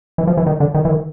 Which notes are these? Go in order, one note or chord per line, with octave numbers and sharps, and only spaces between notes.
E3
F3
E3
D#3
D3
D#3
E3
D#3